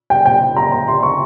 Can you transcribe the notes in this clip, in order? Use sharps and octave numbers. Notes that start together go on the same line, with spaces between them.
G5
G5
A#5
A#5
C6
C#6